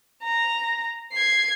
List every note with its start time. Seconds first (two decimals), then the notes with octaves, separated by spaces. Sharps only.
0.23 A#5
1.13 G#6 C7